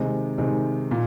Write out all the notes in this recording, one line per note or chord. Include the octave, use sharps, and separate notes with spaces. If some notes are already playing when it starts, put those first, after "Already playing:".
Already playing: C3 D#3 G#3 D#4
C3 D#3 G#3 D#4
A#2